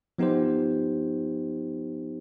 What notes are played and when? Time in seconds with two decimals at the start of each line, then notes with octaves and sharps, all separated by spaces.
0.18 F3 B3 D#4 G4 C5